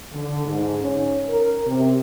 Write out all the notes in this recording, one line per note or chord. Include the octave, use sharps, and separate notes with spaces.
D3
G#2
C#4
A#4
C3